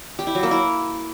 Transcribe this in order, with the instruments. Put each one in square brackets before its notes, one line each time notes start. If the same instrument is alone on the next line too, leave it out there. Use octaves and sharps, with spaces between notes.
[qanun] G4
E4
F#3
A#3
E4